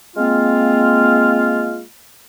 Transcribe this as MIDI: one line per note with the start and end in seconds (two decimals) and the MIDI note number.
0.16 1.82 56
0.16 1.82 58
0.16 1.82 60
0.16 1.82 65